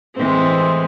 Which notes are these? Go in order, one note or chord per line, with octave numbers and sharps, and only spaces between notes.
A2 E3 G#3 C4